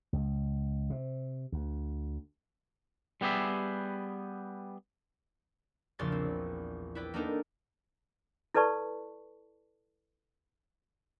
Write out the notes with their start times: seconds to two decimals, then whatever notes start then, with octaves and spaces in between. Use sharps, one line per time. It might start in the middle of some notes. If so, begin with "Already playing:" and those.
0.13 C#2
0.90 C3
1.52 D2
3.21 G3 B3 G4 G#4 E5
5.99 A#1 E2 C#3 D5 C6 A6
6.12 C4
6.95 E4 B4 D5 G5
7.14 A#3 B3 D4 D#4 A4 A#4
8.54 E4 A4 B4 D5 A5 C#6